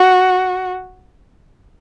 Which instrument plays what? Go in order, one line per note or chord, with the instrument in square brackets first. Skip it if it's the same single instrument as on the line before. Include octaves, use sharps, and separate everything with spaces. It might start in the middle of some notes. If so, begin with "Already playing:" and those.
Already playing: [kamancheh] F#4